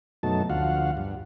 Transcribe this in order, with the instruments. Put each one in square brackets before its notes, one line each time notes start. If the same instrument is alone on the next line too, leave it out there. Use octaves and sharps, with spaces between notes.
[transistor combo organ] F#2 B2 F#3 A3 D#4 A5
D2 F3 F#4 F5 F#5
G2